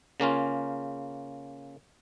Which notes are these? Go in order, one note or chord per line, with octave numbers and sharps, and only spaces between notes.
C#3 A#3 C#4 F4